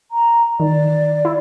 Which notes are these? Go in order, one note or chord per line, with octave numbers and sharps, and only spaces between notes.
A#5
D#3 D5
E4